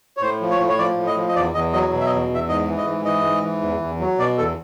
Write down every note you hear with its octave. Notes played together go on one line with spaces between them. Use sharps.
C#5
A2 C5
F3
C#5
A2
C#5
F3 D5
A2
D#5
F3
D#5
E2 D5
E2 D#5
F#3 D#5
B2
E5
D#5
E2
E2 E5
G#2 D#5
E3
D#5
G#2
E3 D#5
G#2
E3
E2
E2
F#3
B2 D5
E2 A4